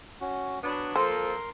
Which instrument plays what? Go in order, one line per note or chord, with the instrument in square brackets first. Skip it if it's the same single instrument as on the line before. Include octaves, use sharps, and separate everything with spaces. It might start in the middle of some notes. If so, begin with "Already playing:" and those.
[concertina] C#4 F#4
[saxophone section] F#3 B3 D4 [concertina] B4
[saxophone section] F3 A#3 A4 [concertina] A#4 C6 [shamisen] C5